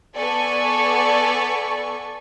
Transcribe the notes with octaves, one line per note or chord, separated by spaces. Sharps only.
B3 A4 D5 G#5 C#6